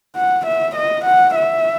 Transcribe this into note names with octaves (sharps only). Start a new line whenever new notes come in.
F#5
E5
D#5
F#5
E5